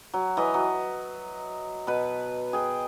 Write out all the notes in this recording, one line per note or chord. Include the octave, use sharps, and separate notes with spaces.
F#3
E3 D#5 E5
F#3
B2 B4
G#4 G5